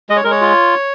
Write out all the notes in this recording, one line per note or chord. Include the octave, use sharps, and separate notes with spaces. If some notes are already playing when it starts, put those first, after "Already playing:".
G#3 D#5
C#5
G#3 A#4
C#5
F4